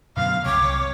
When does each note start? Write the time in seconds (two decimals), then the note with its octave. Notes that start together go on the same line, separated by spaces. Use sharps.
0.17 F#2 B2 D3 F5
0.46 C2 C3 C#5 D6